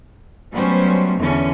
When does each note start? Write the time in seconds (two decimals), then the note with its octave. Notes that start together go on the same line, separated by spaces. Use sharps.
0.53 F#3 G3 A3 B3 C#4 C5
1.18 E2 D3 E3 C#4